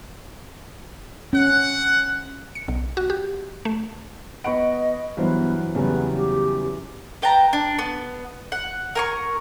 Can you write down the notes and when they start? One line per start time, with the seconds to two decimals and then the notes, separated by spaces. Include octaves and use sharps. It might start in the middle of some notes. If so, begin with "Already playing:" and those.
1.33 C#4 F#5
2.55 C#7
2.68 B1
2.97 F#4
3.10 G4
3.65 A3
4.44 B3 D#5 F#5 B5 C#6 D7
5.17 G2 E3 F#3 B3 C5
5.75 E2 C#3 E3 F#3 G3 B3
6.17 G4
7.22 B4 G5 A5 A#5
7.53 D4
7.79 B3
8.52 F#5
8.95 A#4 G#5 C#6